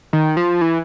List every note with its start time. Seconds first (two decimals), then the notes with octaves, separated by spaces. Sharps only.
0.13 D#3
0.37 F3
0.61 E3